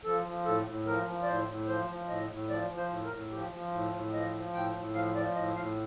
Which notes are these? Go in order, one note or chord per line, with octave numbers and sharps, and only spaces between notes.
F3 A4
F3
A2 A4
A2
F3 A#4
F3
D5
A2 C5
A2
F3 C5
F3
A2 D#5
A2
F3 D5
F3
C5
A2
A#4
A2
F3 G4
F3
A2
A2
F3 D#5
F3
A2 G5
A2
F3 F5
F3 D5
A2 D#5
A2 F5